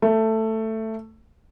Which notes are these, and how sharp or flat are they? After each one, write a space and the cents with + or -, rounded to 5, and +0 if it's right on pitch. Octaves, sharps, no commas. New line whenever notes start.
A3 +10